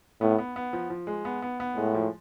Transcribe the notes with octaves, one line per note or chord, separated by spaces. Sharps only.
A2 B3
B3
B3
F3
F3
G#3
B3
B3
B3
A2 G#3
F3